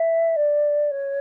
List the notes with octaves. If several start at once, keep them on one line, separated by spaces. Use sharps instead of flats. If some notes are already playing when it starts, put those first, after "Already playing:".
Already playing: E5
D5
C#5